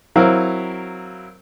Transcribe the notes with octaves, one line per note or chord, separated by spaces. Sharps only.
F#3 C4 E4 A#4 F5